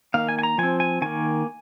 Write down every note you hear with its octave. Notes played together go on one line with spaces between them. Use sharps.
D#3 A#3 F5
G#5
G#5
A#5
F3 C4 G#5
G#5
D#3 A#3 G#5